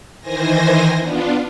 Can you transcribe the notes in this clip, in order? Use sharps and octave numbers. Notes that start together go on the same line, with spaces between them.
D#3 E3 C5 G#5 A#6
B3 D4 F4